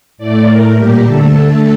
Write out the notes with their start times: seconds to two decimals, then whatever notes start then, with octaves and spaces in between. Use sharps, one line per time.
0.18 A2 A3 D5
0.47 A2 A3 A#4
0.76 A#2 G3 A#3 G4
1.05 D3 A3 A4
1.33 D3 A3